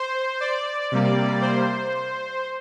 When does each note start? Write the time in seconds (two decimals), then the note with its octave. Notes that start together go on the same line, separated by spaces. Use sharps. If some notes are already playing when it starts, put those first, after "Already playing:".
Already playing: C5
0.40 D5
0.92 C3 G3 A#3
1.42 C5